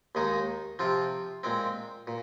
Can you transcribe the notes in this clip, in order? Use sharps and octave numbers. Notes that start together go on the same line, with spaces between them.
D#2 D#3 G#3 D#4
C3 F3 C4 F4
A#2 G#3 C4
A#2